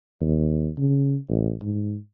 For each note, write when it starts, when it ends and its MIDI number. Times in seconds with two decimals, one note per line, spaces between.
0.21 0.70 39
0.78 1.16 49
1.29 1.53 33
1.61 1.96 44